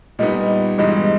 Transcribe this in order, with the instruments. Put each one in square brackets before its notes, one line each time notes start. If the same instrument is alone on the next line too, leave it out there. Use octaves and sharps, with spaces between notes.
[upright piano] A#2 G3 B3 D#4 [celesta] D#5
[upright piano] G1 G2 E3 G#3 D#4 [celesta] D#5